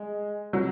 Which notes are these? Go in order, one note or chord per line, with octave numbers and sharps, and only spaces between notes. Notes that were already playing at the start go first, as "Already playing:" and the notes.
Already playing: G#3
F#3